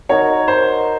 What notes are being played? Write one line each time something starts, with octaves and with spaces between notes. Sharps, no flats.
D#4 F#4 A#4 C#5
C5